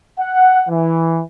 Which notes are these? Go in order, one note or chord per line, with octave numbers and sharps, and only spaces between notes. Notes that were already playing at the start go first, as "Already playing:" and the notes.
F#5
E3